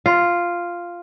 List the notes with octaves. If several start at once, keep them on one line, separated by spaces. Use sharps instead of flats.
F4